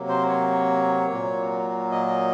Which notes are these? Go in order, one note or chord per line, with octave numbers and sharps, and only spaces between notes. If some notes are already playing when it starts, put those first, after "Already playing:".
Already playing: C3 F#3 A#3
C5
C#5
A#2 F#3 A#3
D#5